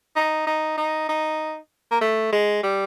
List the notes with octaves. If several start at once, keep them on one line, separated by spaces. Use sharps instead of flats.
D#4
D#4
D#4
D#4
A#3
A3
G#3
G3